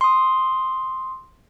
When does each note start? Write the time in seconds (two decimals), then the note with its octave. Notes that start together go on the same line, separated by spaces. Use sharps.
0.01 C6 D#6